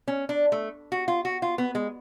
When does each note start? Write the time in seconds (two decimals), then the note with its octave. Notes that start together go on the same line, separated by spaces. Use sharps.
0.08 C#4
0.29 D4
0.52 A3
0.92 F#4
1.08 F4
1.25 F#4
1.42 F4
1.58 B3
1.75 G#3